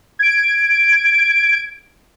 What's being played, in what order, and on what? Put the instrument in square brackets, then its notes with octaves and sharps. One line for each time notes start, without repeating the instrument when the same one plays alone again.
[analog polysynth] G#6 D7